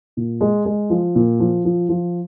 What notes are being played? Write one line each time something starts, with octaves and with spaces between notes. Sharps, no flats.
A#2
G#3
G#3
F3
A#2
F3
F3
F3